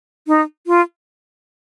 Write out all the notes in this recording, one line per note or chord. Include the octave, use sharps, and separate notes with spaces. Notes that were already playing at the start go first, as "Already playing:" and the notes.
D#4
F4